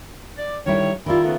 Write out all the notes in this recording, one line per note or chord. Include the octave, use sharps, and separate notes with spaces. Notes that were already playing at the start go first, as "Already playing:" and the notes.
D5
D3 D#3 G3 E4 C#5
D#3 G3 E4 F4
C#3 A3 B3